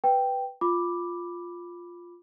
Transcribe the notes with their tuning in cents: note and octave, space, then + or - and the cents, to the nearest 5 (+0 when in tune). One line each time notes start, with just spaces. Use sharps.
B4 +0 G5 +0
F4 +0 B5 +0 D6 +0